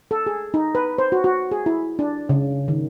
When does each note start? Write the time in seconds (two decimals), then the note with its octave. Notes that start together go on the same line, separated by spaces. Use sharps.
0.11 A4
0.27 G#4
0.54 D#4
0.75 B4
0.98 C5
1.12 F#4
1.24 F#4
1.51 G#4
1.66 E4
1.99 D4
2.29 C#3
2.68 D#3